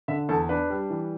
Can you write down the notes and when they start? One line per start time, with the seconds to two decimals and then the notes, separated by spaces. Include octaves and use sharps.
0.08 D3 E5
0.29 E2 A4
0.49 D4 B4
0.70 G3
0.90 E3